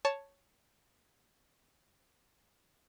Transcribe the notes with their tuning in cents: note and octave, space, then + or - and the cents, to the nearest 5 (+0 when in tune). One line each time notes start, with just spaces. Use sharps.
C#5 +0 A5 +0